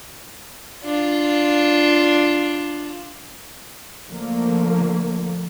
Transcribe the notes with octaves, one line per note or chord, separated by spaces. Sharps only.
D4 F4
D3 F3 A3 A#3